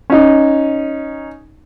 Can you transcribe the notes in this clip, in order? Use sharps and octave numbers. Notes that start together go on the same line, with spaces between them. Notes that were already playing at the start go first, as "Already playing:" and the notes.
C#4 D#4